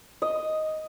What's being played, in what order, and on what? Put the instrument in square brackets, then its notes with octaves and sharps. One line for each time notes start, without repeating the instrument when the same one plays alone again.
[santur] D#5